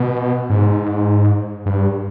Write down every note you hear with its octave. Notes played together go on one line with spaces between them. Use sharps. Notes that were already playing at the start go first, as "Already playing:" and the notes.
Already playing: B2
G#2
G2